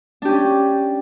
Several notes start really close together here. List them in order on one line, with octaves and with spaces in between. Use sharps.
D4 G4 C#4